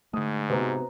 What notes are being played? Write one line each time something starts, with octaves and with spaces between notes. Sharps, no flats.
G#2 D3 A3 D#6
C3 B3 F#4 B4 C5 A#5